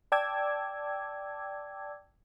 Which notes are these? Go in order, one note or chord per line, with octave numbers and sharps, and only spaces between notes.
D5 G5 A5 D6 E6 G#6